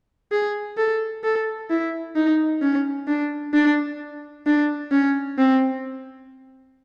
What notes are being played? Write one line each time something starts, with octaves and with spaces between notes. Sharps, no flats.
G#4
A4
A4
E4
D#4
C#4
D4
D4
D4
C#4
C4